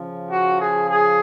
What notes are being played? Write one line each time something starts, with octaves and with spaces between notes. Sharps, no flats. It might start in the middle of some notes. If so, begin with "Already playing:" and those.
Already playing: C#3 F3
F#4
G#4
G#4